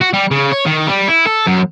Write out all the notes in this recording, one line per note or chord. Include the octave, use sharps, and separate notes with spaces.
F#4
G3
C#3
C#5
D#3
G3
E4
A4
F#2